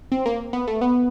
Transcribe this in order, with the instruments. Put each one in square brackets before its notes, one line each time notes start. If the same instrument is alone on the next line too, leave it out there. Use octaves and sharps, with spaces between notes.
[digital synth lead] C4
A#3
B3
A3
B3